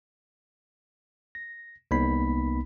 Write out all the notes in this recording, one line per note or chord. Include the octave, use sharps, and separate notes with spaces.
A#6
C2 A#3 B3 D#4 B5 B6